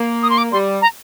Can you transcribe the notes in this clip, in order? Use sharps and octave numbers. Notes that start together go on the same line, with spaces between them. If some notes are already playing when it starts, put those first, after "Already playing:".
Already playing: A#3
D#6
C6
D6
G3 C6
A#5